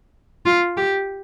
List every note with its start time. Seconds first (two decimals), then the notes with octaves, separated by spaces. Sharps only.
0.46 F4
0.77 G4